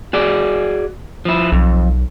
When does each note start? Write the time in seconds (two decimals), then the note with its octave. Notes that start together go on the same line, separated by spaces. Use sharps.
0.13 F#4 G#4 D5
1.25 F3 E4
1.52 B1 F2